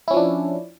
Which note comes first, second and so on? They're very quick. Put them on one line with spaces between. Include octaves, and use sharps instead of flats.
E4 C#4 F3 D4